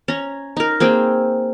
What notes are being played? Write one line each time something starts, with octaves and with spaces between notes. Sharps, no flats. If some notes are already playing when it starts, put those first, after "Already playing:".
C#4 A#5
D#4 A#4
A#3 C4 G#4 G5